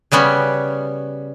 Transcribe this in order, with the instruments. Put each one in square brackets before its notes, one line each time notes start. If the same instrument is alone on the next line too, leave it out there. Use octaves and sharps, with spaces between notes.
[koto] C#3 G3 B3 C#4